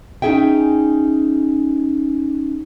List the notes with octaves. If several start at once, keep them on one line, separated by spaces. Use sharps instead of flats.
C#4 D#4 G#4 E5 G5